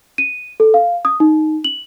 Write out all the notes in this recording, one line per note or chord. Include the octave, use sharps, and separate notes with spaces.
D#7
A4
F5
D#6
D#4
F#7